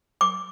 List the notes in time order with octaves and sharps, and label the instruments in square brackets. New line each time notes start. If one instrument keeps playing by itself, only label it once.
[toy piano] D6